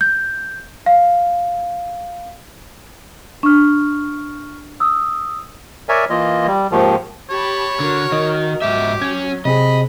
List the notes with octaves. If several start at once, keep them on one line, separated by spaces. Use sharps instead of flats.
G6
F5
D4 C#6 F6
D#6 E6
A#4 C#5 D5 E5 G#5
E3 A#3 F4 D#5
G3
D#2 G#2 D#3 F3
G4 C#5 A5 B5
D3 F#4 A#4
D#3 D#5
G#2 F#3 G4 E5
C#4 G#6
C3 C4 G#4 D#5 B5